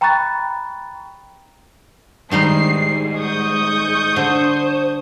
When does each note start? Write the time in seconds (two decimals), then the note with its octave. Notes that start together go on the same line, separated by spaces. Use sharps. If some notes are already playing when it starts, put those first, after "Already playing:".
0.01 G5 A#5 B5 C#6 F#6 A6
2.31 G#2 D#3 G3 D#4 C7
3.17 C#6 D#6 G6
4.16 D3 C5